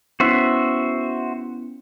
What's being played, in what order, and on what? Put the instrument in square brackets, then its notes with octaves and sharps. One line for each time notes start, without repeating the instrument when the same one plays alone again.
[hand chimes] B3 C#4 E4 [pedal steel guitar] F#4 C5 E5